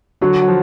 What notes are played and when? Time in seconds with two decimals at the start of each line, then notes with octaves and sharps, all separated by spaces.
0.21 D3 F#3 F#4
0.42 F#3
0.48 F3